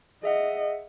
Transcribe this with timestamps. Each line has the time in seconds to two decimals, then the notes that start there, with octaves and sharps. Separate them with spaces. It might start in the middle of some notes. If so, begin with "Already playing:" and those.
0.23 G#4 D#5 E5 F#5